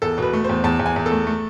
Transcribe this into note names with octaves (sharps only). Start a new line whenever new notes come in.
E2 A4
B2 B4
A3
C5
E2
E2 A5
E2
G#5
E2
A4
A3
A3